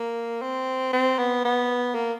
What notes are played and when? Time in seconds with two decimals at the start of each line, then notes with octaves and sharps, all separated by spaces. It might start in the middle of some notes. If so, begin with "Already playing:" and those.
Already playing: A#3
0.42 C4
0.93 C4
1.19 B3
1.45 B3
1.95 A#3